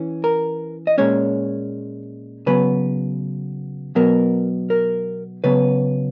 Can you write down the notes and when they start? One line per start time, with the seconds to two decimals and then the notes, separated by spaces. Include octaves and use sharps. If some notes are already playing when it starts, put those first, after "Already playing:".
Already playing: E3 C#4
0.24 A#4
0.87 D#5
0.98 A#2 G#3 C#4 C#5
2.46 C#3 F#3 B3 B4
3.95 B2 F#3 B3 A#4
4.70 A#4
5.44 C#3 F#3 B3 B4